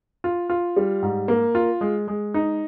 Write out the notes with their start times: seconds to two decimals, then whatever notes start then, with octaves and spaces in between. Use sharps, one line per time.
0.24 F4
0.50 F4
0.76 G3
1.02 G#2
1.28 A#3
1.55 F4
1.81 G#3
2.08 G#3
2.34 D#4